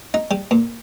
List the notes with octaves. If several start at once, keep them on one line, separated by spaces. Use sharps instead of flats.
D#4
G3
A#2